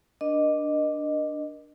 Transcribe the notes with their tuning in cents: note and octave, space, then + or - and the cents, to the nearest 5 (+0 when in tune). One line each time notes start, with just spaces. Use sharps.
D4 +0 A#4 +25 D#5 -15